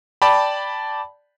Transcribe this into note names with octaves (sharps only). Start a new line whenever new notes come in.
D5 G5 A5 B5